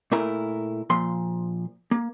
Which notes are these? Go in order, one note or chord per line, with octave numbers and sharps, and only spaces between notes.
A#2 A3 E4 A#4
A#2 F3 C6
A#3